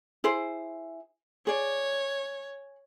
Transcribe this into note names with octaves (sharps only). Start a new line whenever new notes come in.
E4 G#4 C5
G#4 C#5 D5